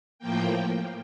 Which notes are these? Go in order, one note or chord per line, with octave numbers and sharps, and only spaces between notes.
A2 F3 A#3 G5